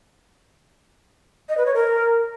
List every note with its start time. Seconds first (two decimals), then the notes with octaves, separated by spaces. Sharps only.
1.49 D#5
1.57 B4
1.66 C#5
1.74 A#4